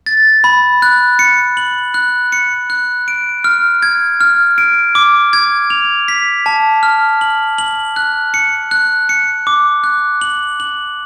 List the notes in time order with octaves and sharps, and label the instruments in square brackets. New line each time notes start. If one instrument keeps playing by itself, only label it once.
[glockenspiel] A6
B5
F#6
C#7
F#7
F#6
C#7
F#6
D7
F6
G#6
F6
D7
D6
G#6
F7
B6
A5
F6
F#7
F#7
F#6
C#7
F#6
C#7
D6
F#6
F#7
F#7